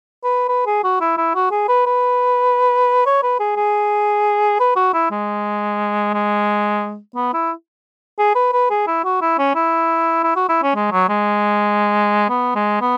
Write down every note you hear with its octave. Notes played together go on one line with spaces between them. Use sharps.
B4
B4
G#4
F#4
E4
E4
F#4
G#4
B4
B4
C#5
B4
G#4
G#4
B4
F#4
E4
G#3
G#3
B3
E4
G#4
B4
B4
G#4
E4
F#4
E4
C#4
E4
E4
F#4
E4
C#4
G#3
F#3
G#3
B3
G#3
B3